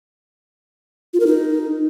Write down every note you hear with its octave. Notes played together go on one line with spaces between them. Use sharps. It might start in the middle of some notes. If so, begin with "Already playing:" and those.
F4
A#4
D#4